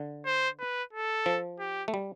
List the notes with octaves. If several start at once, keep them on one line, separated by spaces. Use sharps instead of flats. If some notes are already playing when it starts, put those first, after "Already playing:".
Already playing: D3
C5
B4
A4
F3
G4
A3
G3